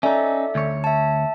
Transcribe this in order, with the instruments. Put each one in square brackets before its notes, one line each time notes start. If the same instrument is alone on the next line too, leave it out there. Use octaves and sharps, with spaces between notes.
[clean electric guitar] C#4 D#4 [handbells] A4 D5 E5
[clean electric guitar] D2 C#5
[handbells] E5 A5